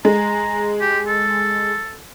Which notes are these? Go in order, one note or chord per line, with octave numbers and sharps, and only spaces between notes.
G#3 A#5
G4
A4